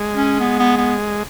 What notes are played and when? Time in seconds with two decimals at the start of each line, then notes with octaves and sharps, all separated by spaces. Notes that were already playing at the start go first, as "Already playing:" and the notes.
Already playing: G#3
0.15 C#4
0.40 B3
0.59 B3
0.78 B3